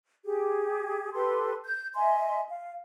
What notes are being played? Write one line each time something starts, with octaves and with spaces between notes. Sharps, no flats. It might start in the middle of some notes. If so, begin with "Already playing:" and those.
G4 G#4
G4 A4 B4 C6
G6
D#5 E5 G#5 C6
F5